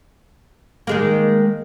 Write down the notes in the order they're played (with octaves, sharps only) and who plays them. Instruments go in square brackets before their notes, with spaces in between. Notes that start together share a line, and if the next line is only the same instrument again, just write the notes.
[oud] D#3 G#3 A#3